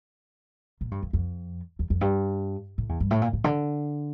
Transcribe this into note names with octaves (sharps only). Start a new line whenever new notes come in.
A#2
G2
F2
F2
E2
F2
G2
A2
E2
G2
A2
A#2
A2
D3